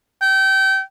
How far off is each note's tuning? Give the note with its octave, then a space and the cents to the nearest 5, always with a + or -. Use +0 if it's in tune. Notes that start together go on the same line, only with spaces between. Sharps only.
G5 -25